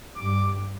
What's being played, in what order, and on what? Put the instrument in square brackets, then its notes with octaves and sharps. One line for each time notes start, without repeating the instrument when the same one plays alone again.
[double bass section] G2 [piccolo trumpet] D6